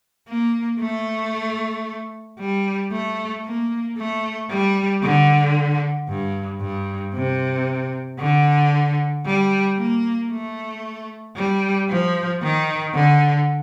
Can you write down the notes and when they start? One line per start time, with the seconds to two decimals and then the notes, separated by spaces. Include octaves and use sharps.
0.28 A#3
0.80 A3
2.40 G3
2.91 A3
3.45 A#3
3.98 A3
4.50 G3
5.03 D3
6.09 G2
6.61 G2
7.15 C3
8.20 D3
9.26 G3
9.78 A#3
10.31 A3
11.36 G3
11.89 F3
12.42 D#3
12.94 D3